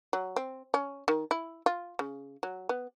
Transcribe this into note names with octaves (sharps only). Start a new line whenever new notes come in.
F#3
C4
C#4
D#3
E4
F4
C#3
F#3
B3